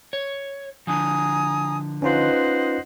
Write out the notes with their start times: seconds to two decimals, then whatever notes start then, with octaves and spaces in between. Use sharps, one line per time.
0.13 C#5
0.87 D3 F3 G#5 A#5 D#6
2.02 C#4 D#4 F4 B4 C5 D#5 F#5